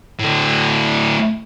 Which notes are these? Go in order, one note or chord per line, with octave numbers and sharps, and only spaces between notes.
A2 D3